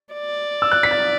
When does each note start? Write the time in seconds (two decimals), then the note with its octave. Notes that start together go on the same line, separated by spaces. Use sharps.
0.13 D5
0.62 E6
0.71 F#6
0.83 B6
0.91 A6